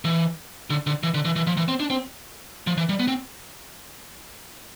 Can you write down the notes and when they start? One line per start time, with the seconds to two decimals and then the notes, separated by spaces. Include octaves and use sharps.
0.05 E3
0.70 D3
0.87 D3
1.03 E3
1.14 D3
1.25 E3
1.36 E3
1.47 F3
1.57 E3
1.68 C4
1.80 D4
1.90 C4
2.67 F3
2.78 E3
2.89 G3
3.00 B3
3.08 C4